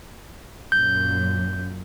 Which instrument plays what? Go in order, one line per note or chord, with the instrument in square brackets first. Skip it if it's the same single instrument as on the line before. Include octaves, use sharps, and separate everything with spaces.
[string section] F#2 A#2 [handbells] G6